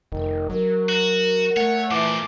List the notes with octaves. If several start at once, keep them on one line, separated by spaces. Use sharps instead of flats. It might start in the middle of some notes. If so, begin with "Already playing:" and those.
F1 D#3
F#3 A#4
F#4
A3 C#5 F#5
A#2 E3 F3 D6